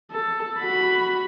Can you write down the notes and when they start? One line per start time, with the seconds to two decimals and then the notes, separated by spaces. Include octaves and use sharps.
0.11 A4
0.59 F#4 B5